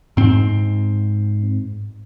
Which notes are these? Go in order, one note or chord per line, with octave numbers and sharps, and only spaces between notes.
G#2 C4